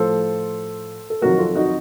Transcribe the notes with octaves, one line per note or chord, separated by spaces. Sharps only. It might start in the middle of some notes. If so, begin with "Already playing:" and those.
Already playing: A2 F3 A4 C5
A4
F2 C3 D#3 F#3 F#4 A#4
F4 A4
D#4 F#4